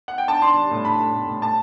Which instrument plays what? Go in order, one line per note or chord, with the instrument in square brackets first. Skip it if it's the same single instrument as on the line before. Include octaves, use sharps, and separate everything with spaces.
[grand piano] F#5
G5
D4 A5
D4 C6
G3
A2
D4 B5
A2
A2
A2
A2 A5